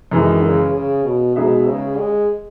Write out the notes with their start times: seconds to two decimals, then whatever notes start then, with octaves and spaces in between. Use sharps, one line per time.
0.11 F#2 D#3 E3 G#3
0.43 C#3
0.73 C#3
1.04 B2
1.36 B2 G#3 D#4 G#4 B4 E5
1.67 C#3
1.97 G#3